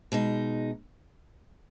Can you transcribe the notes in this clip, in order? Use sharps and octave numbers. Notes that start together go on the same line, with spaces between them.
B2 G#3 D#4